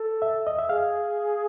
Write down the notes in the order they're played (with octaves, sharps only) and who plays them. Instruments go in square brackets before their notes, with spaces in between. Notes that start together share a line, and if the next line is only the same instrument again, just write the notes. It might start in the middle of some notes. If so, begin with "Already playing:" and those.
Already playing: [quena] A4
[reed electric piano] E5
D#5
E5
[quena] G#4 [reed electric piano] F5